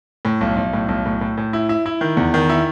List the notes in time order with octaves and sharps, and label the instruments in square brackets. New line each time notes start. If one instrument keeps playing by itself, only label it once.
[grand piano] A2
B1
B1
A2
B1
A2
A2
A2
E4
E4
E4
D#3
E2
D#3
E4